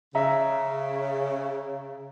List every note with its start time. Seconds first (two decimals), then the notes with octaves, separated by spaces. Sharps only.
0.15 C#3 E5 A#5